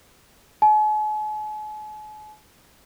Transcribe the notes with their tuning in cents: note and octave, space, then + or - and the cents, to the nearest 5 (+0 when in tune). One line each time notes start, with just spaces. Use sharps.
G#5 +45